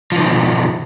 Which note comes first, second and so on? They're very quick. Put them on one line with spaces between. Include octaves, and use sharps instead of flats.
F3 D3 D#3 B2